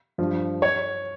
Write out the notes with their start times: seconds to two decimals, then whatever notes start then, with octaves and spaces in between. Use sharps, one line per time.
0.18 G2 F3
0.62 C#5